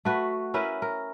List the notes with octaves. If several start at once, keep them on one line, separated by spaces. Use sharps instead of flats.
A3 F#4 B4
C#4 E4 A#4 B4
A#4